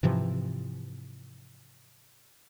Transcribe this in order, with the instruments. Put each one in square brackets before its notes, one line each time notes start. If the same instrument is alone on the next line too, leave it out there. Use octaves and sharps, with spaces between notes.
[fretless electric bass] G#2 C3 E3 F3